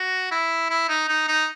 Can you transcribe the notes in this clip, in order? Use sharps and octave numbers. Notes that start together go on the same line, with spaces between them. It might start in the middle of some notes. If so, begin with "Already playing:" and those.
Already playing: F#4
E4
E4
D#4
D#4
D#4